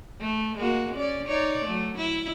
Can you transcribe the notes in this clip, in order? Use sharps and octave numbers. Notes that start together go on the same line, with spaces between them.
A3
G#3 A#3 F#4
C#4 D5
D#4 C#5 D5
F#3 A3
E4